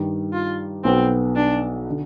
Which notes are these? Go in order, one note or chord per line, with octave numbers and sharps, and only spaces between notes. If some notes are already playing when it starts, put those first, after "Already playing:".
Already playing: G2 D#3 G3
F4
B1 B2 B3 C4
D4
D3